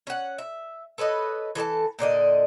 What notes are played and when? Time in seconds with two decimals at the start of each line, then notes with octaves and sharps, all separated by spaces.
0.07 C#4 F#5
0.38 E5
0.98 A4 B4 C#5 D#5
1.55 E3 A4 D#5 A5
1.99 A#2 D3 D5 D#5